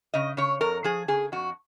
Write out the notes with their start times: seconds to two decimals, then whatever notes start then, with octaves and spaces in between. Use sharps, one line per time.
0.14 C#3 D#5
0.37 C#3 C#5
0.61 F2 A#4
0.84 F3 G#4
1.08 C#3 G#4
1.32 F2 F#4